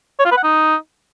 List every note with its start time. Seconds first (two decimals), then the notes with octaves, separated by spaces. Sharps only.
0.19 C#5
0.25 F4
0.31 B4
0.37 F#5
0.43 D#4